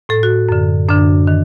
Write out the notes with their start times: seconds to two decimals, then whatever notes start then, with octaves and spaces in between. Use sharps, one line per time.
0.09 A2 A4
0.23 F#4
0.49 F#2 D3
0.89 F#2 D3 D4
1.27 D#3